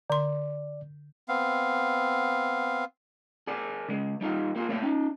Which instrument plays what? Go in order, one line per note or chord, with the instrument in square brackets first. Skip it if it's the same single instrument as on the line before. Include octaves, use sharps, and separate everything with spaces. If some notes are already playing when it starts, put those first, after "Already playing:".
[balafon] D3 C6 [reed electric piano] D5
[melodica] B3 C4 F5
[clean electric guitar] G#4 A#4 D5
C#3 G#3
G3 D#4 F4 G4
A#3 F4 G4 G#4
A3 A#3 C#5 E5 F5 G5
C#4 D#4